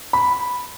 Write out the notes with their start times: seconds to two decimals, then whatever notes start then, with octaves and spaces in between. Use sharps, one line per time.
0.13 B5